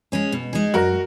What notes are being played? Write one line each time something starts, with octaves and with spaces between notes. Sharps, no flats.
G#3 C#4 G#4
B2
G#3 D#4 G#4
F#2 F#4 A#4